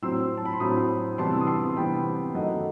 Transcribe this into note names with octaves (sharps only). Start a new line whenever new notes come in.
A2 F#3 C4 C6 E6
A5
B5
C6
A2 F#3 C4 B5 D#6
C3 E3 G3 B3 A5 C6
E6
D#6
A5 C6
C3 E3 G3 B3 G5 B5
F#2 D#3 A3 D#5 F#5